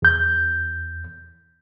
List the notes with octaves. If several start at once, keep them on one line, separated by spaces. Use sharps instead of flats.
E2 G6